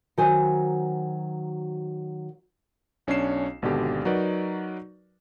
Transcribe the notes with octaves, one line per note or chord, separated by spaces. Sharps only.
D#3 F#3 F#4 C5 G#5
B1 C#4 D4 C#5 C7 E7
G#1 B2 D3 G4
F#3 D#4 F#4 A#4 B4 D5